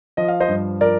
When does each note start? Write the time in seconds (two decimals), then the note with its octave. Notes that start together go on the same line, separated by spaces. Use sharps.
0.17 F3 D#5
0.28 F5
0.40 C5 D#5
0.49 G2
0.81 F3 A#4 D5